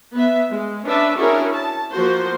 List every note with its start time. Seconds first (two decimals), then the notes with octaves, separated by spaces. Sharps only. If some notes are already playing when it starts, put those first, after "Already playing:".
0.15 B3 E5
0.52 G#3
0.86 C#4 D4 B4 E5
1.17 C#4 D4 E4 F#4 G#4 A#4
1.53 A5
1.92 F3 A#3 F#4 C5